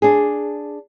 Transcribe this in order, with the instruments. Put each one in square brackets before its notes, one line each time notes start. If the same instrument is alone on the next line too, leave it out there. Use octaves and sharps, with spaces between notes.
[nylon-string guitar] D4 G#4